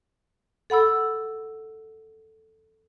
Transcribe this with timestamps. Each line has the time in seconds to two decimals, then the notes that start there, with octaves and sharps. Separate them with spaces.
0.70 A4 F#5 B5 E6